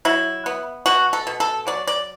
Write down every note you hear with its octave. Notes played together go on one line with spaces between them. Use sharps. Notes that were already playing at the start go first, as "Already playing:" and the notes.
F#3 E4
B3
B2 F#4
A4
B2
A4
F#3 D5
D5